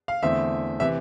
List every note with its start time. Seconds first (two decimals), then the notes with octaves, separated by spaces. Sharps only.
0.08 F5
0.23 E2 D3 A3 C4 E5
0.80 C3 E3 E5